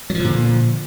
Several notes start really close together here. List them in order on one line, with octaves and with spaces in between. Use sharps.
F#3 F3 D3 A#2